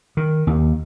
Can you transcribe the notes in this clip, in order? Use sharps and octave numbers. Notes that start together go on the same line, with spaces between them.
D#3
D#2